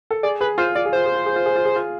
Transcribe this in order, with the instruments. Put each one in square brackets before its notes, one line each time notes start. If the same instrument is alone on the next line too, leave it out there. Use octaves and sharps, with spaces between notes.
[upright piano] A4
[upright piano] G#4 [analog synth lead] D5
[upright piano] G#4 [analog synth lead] B4
[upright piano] F4 [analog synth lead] C5
[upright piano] F4 [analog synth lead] D5
[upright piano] G#4
[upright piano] F4 [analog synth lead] C5
[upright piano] G#4
F4
G#4
F4
G#4
F4
G#4
F4